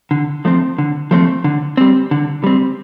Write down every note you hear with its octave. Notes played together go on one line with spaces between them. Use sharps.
D3
F3 A3 C4
D3
F3 A3 C4
D3
G3 C4
D3
G3 C4